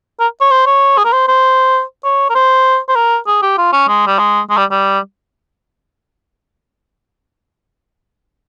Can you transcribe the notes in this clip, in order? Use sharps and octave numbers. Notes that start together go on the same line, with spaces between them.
A#4
C#5
C5
C#5
G#4
A#4
C5
C5
C#5
A#4
C5
C5
A#4
G#4
G4
F4
C#4
G#3
G3
G#3
G#3
G3
G3